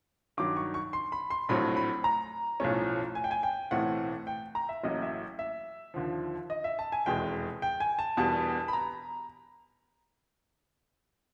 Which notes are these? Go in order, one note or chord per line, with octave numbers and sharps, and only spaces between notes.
G2 D#3 F#3 D6
C#6
C#6
C6
B5
C6
A#1 A2 F#3 A3 C4 B5
B5
A#5
B1 A2 F3 A3 C#4
G#5
G5
G#5
G5
B1 A2 E3 A3 C4 F#5
G5
A#5
E5
A1 A2 F#3 A#3 D#5
E5
E5
D#2 D3 F3
D#5
E5
A5
G#5
F1 E2 B2 G#3 G5
G5
G#5
A5
E1 E2 B2 G3 B3 A5
B5
A#5